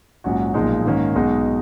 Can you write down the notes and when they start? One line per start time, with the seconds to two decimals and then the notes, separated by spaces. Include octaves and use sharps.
0.24 A#1 G#2 F#3 C#4 F#4
0.54 B1 A#2 F3 G#3 D#4
0.85 G#2 D#3 A#3 C#4
1.15 B1 B2 G#3 D#4 F#4